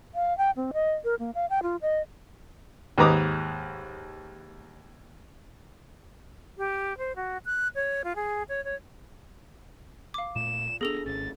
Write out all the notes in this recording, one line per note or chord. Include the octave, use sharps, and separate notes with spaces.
F5
G5
C4
D#5
A#4
A#3
F5
G5
F4
D#5
D#2 G#2 B4 A#5 D6 D#6
G4
C5
F#4
F#6
C#5
F4
G#4
C#5
C#5
F5 D6
A#2 A3 E7
B3 D4 G#4 A4 A#6 F7
G#1 C#4 A6